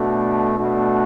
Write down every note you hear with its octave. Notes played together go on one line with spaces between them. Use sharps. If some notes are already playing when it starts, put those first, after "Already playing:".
Already playing: B2 A3 D4 F#4
B2 A3 D4 F#4